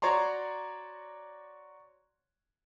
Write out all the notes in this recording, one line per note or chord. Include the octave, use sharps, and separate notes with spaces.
F#4 C#5 D5 A#5 C6